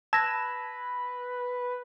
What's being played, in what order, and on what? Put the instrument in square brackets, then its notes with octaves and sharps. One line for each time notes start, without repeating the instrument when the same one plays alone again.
[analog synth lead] B4 [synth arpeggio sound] A5 G#6 E7 [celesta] E6 A#6